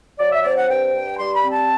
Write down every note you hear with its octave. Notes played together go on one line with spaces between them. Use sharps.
F#3 D5
E5
C4 D5
F#5
G2 G5
G2
G3 C6
B5
C4
A5